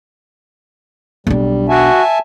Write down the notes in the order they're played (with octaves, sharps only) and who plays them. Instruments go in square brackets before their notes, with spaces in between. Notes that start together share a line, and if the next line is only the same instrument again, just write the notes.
[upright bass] B1 D4 [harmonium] G3
[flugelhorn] F#4 [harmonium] E5 G#5 A5